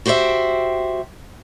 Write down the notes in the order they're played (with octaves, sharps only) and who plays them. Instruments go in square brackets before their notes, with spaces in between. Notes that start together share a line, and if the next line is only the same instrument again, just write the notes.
[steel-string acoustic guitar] F#4 G4 C5 C#5 E5 G5